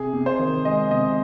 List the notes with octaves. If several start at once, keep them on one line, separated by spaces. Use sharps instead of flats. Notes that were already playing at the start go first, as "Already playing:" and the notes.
Already playing: C3 G#4
C3
C5
D#3
G#3 D#5
C3 D#5